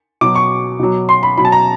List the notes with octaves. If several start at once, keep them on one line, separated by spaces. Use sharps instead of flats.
B2 F#3 D6
C#6
B2 F#3
C6
B5
B2 F#3 B5
A5
A#5